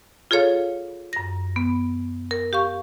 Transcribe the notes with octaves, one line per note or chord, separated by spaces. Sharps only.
F4 G#4 A4 C#5 F5
F#2 A#6
B3
A#4
G4 F5 C#6